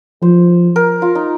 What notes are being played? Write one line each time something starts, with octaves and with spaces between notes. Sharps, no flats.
F3 C5
A#4
F4
D#4